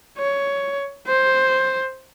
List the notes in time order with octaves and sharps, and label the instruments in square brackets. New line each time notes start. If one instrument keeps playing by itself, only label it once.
[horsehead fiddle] C#5
C5